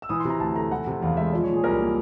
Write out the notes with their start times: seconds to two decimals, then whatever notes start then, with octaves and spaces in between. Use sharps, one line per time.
0.02 E6
0.09 E3 D#6
0.20 C6
0.25 C3
0.30 A#5
0.40 D2 A5
0.56 A3 A#5
0.71 E3 F#5
0.87 C3
1.02 E2 F5
1.17 G#3 E5
1.33 F3 D5
1.44 C#5
1.48 A#2
1.54 G#4
1.64 C2 A#4
1.80 A#3